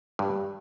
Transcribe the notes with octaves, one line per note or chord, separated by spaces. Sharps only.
G2 G3